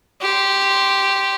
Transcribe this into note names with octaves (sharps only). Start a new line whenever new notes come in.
G4 C6